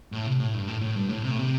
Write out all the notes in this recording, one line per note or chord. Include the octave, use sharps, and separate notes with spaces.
A2
C3
A2
G2
A2
A2
G2
A2
C3
A2
C3